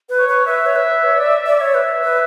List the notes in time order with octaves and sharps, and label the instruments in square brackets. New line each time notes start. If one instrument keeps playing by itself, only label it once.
[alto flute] B4
[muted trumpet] C#5
[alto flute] B4
[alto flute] B4 [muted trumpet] E5
[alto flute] C#5
B4
C#5
D5
D5
[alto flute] C#5 [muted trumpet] E5
[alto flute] B4
B4